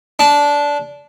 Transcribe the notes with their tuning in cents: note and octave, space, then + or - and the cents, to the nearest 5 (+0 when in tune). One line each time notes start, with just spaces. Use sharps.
D4 -15